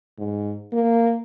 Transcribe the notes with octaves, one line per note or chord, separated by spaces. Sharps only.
G#2
A#3